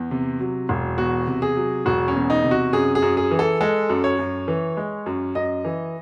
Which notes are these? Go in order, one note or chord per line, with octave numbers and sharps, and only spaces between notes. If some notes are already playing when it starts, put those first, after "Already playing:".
Already playing: E2
C3
F#3
E1
E2 F#4
C3
G#4
F#3
E1 F#4
C#4
E2
D#4
C3
F#4
F#2 G#4
G#4
F#2
G#4
E3
A4
G#3 A4
F#2
C#5
F#2
E3
G#3
F#2
F#2 D#5
E3